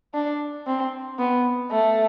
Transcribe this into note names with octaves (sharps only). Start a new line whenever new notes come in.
D4
C4
B3
A3